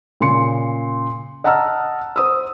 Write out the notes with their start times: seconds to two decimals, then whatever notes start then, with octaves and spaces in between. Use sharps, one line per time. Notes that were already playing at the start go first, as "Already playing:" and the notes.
0.20 A#2 C#3 C6 C#7
1.44 D#5 F#5 A5 A#5 E6 F6
2.16 C5 D#6 E6